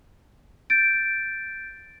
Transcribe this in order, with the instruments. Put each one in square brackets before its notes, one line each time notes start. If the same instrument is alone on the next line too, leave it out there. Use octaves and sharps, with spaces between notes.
[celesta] G6 A6 D7